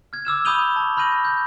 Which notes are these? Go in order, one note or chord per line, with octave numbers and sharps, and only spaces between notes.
F6 G#6
D6 E6 F6 E7
B5 D#6 G6 D#7 F7 G7
A5 C#6
B5 F6 G6 A#6 D#7 F#7
G6